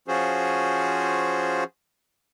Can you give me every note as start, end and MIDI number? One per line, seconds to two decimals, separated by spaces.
0.08 1.64 53
0.08 1.64 61
0.08 1.64 65
0.08 1.64 66
0.08 1.64 68
0.08 1.64 72